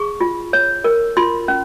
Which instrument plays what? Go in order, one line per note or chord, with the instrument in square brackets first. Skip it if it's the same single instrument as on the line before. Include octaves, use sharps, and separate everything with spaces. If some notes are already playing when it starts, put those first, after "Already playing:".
Already playing: [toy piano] G#4 C#6
F4
C#5
A#4
F4 C6
C#4